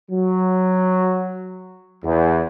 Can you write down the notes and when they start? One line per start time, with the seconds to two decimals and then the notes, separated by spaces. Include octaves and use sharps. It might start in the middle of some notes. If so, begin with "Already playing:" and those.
0.11 F#3
2.04 E2